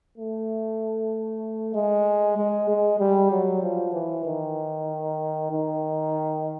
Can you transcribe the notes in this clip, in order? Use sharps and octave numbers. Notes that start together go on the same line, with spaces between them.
A3
G#3
G#3
G#3
G3
F#3
F3
E3
D#3
D#3